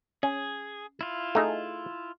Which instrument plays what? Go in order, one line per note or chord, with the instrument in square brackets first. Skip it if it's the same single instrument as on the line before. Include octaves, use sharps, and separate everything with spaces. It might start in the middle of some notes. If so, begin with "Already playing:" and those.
[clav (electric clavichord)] C#4 [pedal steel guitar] G#4
[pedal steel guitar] E4 F4
[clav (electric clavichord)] A3 D#4 G#4